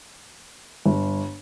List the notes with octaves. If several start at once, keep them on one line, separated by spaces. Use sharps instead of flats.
G1